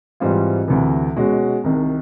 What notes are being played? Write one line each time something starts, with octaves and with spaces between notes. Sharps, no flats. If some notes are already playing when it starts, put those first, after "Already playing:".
G#2 E3 G3 C4 F4
D2 C3 E3
B2 G#3 C#4 F#4
C2 C3 D#3